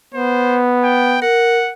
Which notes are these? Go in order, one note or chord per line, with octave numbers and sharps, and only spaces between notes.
B3 C5
G5
A#4 F#5